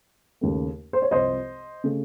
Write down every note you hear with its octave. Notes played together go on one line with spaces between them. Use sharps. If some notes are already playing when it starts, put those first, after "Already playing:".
D#2 C#3 A3
C5
C#5
C2 C3 F3 C5 D#5
C#3 A3